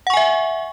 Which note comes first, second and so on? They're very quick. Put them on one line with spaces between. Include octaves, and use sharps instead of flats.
F#5 C#6 G#5 E5